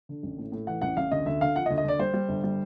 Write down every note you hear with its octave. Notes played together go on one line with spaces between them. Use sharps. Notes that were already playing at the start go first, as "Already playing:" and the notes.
D3
A1
A2
A2
E3 F#5
A1 F#5
A1 F5
D2 D#5
D2 E5
D3 F5
F3 F#5
D#5
D2
D#5
D2 D5
G3 C5
G3
G1
G3